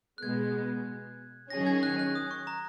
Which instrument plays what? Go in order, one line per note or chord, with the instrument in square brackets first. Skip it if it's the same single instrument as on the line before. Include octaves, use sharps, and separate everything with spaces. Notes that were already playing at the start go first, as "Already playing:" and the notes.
[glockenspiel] F#6
[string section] B2 G#3 B3 [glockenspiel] G#6
[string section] D#3 F#3 C#4 G#4 [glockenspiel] A#6
[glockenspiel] G#6
F#6
F#6
D#6
C#6
A#5